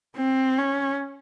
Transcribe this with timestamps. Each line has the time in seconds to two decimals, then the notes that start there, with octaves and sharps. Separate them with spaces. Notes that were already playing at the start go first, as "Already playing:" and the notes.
0.17 C4
0.58 C#4